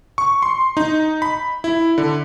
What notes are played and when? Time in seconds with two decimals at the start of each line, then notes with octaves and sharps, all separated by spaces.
0.18 C#6
0.42 C6
0.77 D#4
1.22 B5
1.64 E4
1.98 D3